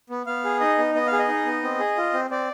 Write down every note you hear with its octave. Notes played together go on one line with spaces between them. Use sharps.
B3
B3 F5
G#4
D#4 D#5
B3
B3 D#5
F5
G#4
D#5
D#4
B3
C4
G#4
F4
C4
C4 D5